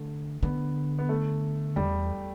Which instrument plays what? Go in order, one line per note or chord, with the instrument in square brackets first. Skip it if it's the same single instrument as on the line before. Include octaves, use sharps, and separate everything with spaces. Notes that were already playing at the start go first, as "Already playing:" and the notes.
Already playing: [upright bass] D3 [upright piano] A3
[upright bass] D3 [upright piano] B3
[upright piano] B3
A3
[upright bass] E2 [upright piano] G3